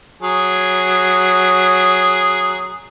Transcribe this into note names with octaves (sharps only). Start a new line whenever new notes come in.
F#3 G#4